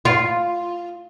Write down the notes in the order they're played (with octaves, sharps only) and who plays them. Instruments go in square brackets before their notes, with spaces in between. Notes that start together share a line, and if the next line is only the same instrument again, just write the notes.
[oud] F4